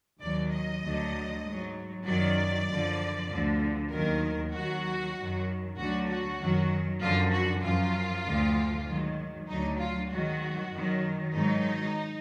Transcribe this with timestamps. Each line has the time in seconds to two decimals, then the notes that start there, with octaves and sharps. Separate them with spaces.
0.19 D#2 D#3 F#3 D5
0.50 D#5
0.81 D2 D3 F#3
1.44 G#2 F#3
2.06 F#2 D#3 F#3 D5
2.67 F#2 D3 F3
3.29 D2 D3 F3
3.91 D#2 D#3 F#3 A#4
4.53 D#2 D#3 F#3 F#4
5.15 F#2 D#3 F#3
5.76 D2 D3 F#3 F#4
6.08 F#4
6.39 F#2 D#3 F#3
7.00 F#2 D3 F3 F4
7.32 F#4
7.62 F#2 F3 F4
8.24 D2 D3 F3
8.87 G#2 D#3 F#3
9.48 D2 D3 F#3 D#4
9.79 F4
10.10 G#2 D#3 F#3 F#4
10.72 F#2 D#3 F#3
11.33 G#2 D#3 F#3 D#4